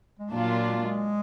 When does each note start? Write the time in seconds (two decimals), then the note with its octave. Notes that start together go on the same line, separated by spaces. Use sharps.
0.19 G#3
0.30 A#2 F#3 A#3 D4 F4
0.50 A#3
0.69 G#3
0.76 A#3
0.84 G#3